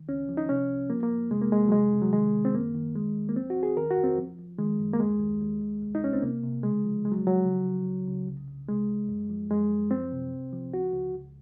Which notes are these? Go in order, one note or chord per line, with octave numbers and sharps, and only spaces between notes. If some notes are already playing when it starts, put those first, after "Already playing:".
Already playing: D#3
C#2 C#4
F3
D#4
C3 C#4
C2
F3 A#3
A#3
F2
C3 G#3
A#3
F2 G#3
F#3
C3 G#3
C3
F#3
D#3 G#3
D#3
C4
F#2 A#3
D#3
D#2 G#3
D#2
A#3
F3 C4
F#4
D#2
G#4
D#3 A#4
F#4
F2
C4
F3
F3
D#3 G#3
F#2
A#3
D#2 G#3
D#2
D#2
D#2
C2
D#4
C2 C#4
C4
C3 A#3
C3
C#3 G#3
F3
C2 G#3
F#3
F3 F#3
C#3
C#3
C#2
C#3
C2
C2
C3 G#3
C#2
F#2
F3
F#2 G#3
F#2
F3 C4
C3
C2
F3
C#2 F#4
C#2
C#2